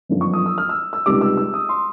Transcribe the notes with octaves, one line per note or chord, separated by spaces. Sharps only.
G1 F#2 D3 F3
C#6
D#6
E6
F6
E6
E6
C#2 C3 D#3 G3 D6
E6
E6
D#6
C6